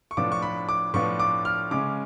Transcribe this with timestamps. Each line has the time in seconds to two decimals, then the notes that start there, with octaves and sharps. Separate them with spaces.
0.11 C#6
0.17 A2 F3 B3 D4 F4 D6
0.32 C#6
0.42 B5
0.69 D6
0.94 A2 F3 B3 D4 F4 C#6
1.20 D6
1.45 F6
1.71 C#3 G#3 C#4 D6